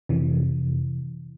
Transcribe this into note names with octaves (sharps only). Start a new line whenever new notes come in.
F2 C3 E3